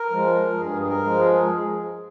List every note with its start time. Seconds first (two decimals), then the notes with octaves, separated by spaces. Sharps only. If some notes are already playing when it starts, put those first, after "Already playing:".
Already playing: A#4
0.11 F3 G#3
0.57 G2 G#4
0.82 G#4
0.88 A#4
1.03 F3 G#3
1.19 G#4